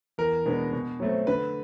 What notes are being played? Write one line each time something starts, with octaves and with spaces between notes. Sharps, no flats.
E2 A#4
B2 G#3 B3 D4
B2
F#3 A3 C4
D3 B4